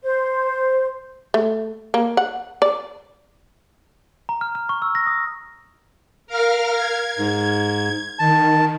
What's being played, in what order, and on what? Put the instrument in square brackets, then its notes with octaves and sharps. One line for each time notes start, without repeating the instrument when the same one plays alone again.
[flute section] C5
[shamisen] A3
A#3
F#5
D5
[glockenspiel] A#5
F6
F6
C#6
E6
A#6
D#6
[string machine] A#4 F5 F6
G#6
[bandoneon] G#2
[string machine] D#3 [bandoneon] A5